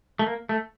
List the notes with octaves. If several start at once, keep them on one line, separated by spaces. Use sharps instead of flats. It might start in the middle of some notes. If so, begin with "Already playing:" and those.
A3
A#3
A3